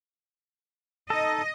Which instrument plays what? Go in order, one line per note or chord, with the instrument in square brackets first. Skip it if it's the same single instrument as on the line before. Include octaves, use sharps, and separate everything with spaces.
[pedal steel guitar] D#4 A4 [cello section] D#5